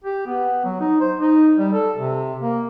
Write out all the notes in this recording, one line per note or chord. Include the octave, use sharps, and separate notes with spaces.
G4
B3
F#3
D#4
C5
D#4
G3
A4
C3
A#3